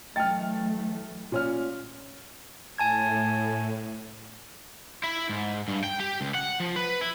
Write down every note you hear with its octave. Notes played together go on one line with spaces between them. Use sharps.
E3 F#3 A3 D#5 G5 A5 F6 A6
A#2 C#4 F6
A2 G#5 A5 G#6
E4
G#2
G2
G5
G4
C#2
F#5
F3
B4
E4